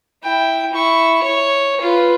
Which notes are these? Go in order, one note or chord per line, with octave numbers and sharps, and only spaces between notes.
E4 G5
E4 C#6
C#5
F4 B4